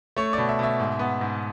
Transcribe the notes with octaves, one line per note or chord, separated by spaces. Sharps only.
A3 C#5
B2 D5
E5
B2 E5
G#2
B3
G#2